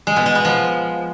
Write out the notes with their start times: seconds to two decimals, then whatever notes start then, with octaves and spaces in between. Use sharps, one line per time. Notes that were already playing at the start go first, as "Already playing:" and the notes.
0.07 G#3
0.16 B2
0.26 G#3
0.35 B3
0.45 F3